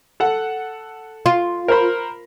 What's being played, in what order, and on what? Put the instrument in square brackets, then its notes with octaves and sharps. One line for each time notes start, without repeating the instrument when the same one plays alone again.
[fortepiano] A4 F#5
[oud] F4
[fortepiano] A#4 C5 B5